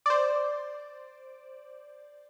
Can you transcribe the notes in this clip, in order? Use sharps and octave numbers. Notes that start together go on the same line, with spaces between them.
C5 D5